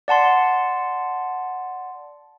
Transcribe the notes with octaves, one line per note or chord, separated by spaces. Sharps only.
D5 F#5 A5 C6